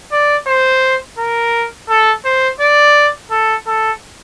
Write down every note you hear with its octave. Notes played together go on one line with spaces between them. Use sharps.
D5
C5
A#4
A4
C5
D5
A4
A4